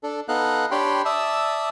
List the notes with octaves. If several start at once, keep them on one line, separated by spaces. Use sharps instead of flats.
D4 A4
B3 D#4 A4 D#5 F5 F#6
D4 G4 C#5 G5 B5 C6
D5 E5 A5 D#6 E6